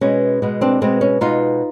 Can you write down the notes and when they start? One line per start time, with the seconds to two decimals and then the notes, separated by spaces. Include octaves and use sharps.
0.01 B2 G#3 B3 C#4
0.42 B2 G#3 B3
0.61 C4 D4
0.81 B2 G#3 B3 C4
1.01 C#4
1.21 B2 G#3 B3 D#4 F4